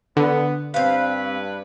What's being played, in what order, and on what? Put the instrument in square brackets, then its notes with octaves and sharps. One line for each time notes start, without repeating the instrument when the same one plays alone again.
[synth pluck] D3 [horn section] B3
[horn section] G2 B4 [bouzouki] C4 F5